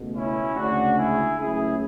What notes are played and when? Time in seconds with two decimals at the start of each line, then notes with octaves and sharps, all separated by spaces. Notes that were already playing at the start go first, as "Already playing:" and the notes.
Already playing: C#2 B2 A3
0.15 C#4 E4
0.55 D2 C#3 G#3 D4 F#4
0.97 E4 G#4
1.38 C#2 C#3 F#3 A3 E4 G#4